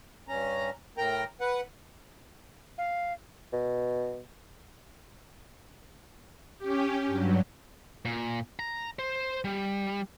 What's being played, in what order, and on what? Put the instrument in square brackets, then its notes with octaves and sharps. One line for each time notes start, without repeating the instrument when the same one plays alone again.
[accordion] G2 C#4 A#5
A2 A#4 G5 A#5
B4 F#5
[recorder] F5
[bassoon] B2
[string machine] C#4 G4
G2 F#3
[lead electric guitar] A#2
A#5
C5
G3